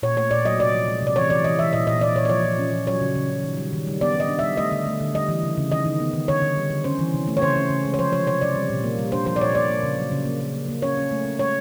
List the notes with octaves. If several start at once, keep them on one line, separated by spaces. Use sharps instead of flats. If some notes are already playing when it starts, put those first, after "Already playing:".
A#2 C#5
A3 C#5
A#2 D5
F#3 D#5
C3 D5
F3
G#3
C3 D5
E3 C#5
E3 D5
E3 D#5
E3 E5
A#2 D#5
A#2 D#5
A#2 D5
A#2 C#5
D5
F3 C#5
F3
C#4
F3
F#3 C#5
C#3
C#3
C#3
D#3
G3
D#3
G3
B3 D5
G3 D#5
D4
E5
G3
A3 D#5
D3
A3
D3
G3 D#5
E3
C#3
C#3
D#3 D#5
D#3
B3
D#3
D3 C#5
D3
G3
D3
C#4 C5
E3
C3
A3
C#5
C#3 C5
C#4
C#3
G#3
C#5
F3 C5
F3 C#5
C3 C#5
C3 D5
G3
A#2
A#3
G3
D4 C5
F3 C5
D5
A#2 C#5
A#3 D5
A#3
C#3
F#3
C#3
A#3
A#3
A#3
A#3
C#4 C#5
C#4
A3
C#4
G#3 C#5